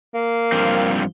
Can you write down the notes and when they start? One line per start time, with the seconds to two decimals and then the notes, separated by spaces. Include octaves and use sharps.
0.15 A#3
0.52 G2 F3 C4